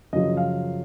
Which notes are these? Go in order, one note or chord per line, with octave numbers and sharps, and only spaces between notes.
F#2 C#3 F3 D#5
F5